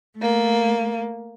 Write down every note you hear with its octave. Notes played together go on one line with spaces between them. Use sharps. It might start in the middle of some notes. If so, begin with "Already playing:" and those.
A3 A#3